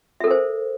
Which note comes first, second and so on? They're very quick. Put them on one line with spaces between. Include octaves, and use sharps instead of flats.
E5 A4 A#4 C5